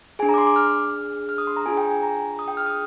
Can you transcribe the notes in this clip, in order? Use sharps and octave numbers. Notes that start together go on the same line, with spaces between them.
D4 G#4 G#5
A#5
D6
C6
D6
F6
F6
D#6
C6
A#5
D4 F4 G#4 G#5
G5
G#5
A#5
D#6
G5
F6
D#6